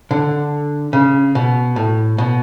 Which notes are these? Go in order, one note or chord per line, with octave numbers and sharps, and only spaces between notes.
D3
C#3
B2
A2
B2